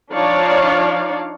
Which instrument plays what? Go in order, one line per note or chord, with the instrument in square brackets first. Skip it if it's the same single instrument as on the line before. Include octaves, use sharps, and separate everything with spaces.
[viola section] F3 D4 D#4 C#5 D5 F5